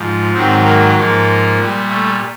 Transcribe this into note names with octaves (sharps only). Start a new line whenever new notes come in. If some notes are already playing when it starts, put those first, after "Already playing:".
Already playing: G#2 F3
G#2 D#3 F#3 C4
A#3
G#2 F3 A#3
A#2 G3
A3